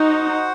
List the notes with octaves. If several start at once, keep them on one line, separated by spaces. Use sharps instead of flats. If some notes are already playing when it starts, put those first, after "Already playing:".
Already playing: D#4 F#4 C5 F#5